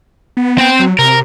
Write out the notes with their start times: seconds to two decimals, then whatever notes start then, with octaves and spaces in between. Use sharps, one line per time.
0.37 B3
0.58 C4 G5
0.79 F#3
0.99 C3 A#4